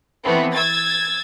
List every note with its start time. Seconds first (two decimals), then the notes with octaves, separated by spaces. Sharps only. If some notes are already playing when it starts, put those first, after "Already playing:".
0.24 E3 A3 B3 C4
0.53 E6 G#6 A6